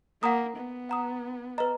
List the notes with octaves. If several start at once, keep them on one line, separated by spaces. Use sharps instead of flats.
A#3 F#5 A#5 D#6
B3
F#5 A#5 D#6
B4 D#5 A#5